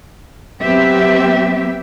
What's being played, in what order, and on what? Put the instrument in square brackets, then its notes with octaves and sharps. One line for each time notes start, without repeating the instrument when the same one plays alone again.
[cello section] F#3 B3 C4 G4 E5